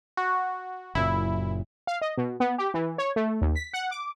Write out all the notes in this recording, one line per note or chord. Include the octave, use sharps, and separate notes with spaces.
F#4
F#1 F#2 A#2 E4
F5
D#5
B2
B3
G4
E3
C#5
A3
D#2
B6
F#5
D6